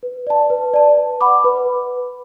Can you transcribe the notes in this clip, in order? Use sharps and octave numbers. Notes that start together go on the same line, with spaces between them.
B4
D5 A5
B4
D5 A5
B4
F#5 B5 D6
B4